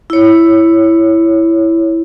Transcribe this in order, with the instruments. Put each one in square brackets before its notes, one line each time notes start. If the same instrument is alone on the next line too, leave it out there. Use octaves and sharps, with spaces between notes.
[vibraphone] E4 C#5